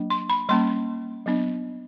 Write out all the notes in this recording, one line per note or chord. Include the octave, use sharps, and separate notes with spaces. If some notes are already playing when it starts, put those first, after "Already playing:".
Already playing: F#3 A#3 D4
C6
B5
G3 A#3 C#4 C6
F#3 B3 D4